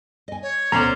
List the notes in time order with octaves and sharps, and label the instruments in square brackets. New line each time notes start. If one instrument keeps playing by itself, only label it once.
[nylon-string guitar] D#5 G#5
[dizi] C#5
[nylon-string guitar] D2 B2 A3 [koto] C#4 C5 D5 [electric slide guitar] A#5